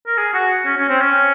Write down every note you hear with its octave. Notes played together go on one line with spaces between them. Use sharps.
A#4
G#4
F#4
C#4
C#4
C4
C#4